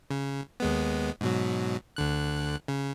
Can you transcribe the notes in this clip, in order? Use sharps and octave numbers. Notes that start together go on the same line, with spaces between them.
C#3
D#2 G#3 B3
G#2 B2 F#3
D2 D3 F#6
C#3